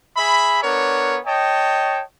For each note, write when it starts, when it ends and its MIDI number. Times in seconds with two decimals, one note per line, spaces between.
0.17 0.60 68
0.17 0.60 76
0.17 0.60 83
0.62 1.18 59
0.62 1.18 62
0.62 1.18 70
0.62 1.18 73
1.26 2.02 73
1.26 2.02 75
1.26 2.02 79
1.26 2.02 81